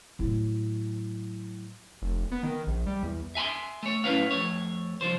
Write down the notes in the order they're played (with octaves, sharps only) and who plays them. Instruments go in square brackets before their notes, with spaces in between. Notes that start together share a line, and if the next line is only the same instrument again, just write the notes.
[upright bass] A2 F#3
[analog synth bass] F1
B3
D#3
A#1
G3
E2
[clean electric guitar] E5 G#5 B5 C6
A3 C#5
F#2 A2 C#4 B4 C#5 F5
F2 A3 C#5
C2 F3 C5